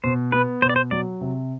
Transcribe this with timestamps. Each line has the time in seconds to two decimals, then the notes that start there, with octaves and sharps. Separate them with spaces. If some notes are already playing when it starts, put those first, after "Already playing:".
0.04 B2 C5
0.32 B3 B4
0.62 B2 C5
0.69 D5
0.76 C5
0.91 F#3 D5
1.21 C3